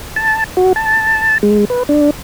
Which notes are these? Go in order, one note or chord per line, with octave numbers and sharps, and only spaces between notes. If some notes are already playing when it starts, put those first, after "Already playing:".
A5
F#4
A5
G#3
B4
D4